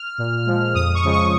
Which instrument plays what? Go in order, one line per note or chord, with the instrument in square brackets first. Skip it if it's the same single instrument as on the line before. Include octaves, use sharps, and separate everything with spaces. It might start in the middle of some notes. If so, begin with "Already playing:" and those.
Already playing: [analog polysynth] F6
A#2
F3 G#3
F2 D#6
C#6
C#3 F3 G#3
C#6